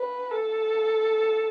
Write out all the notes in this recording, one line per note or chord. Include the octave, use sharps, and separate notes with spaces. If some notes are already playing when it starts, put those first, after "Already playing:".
Already playing: B4
A4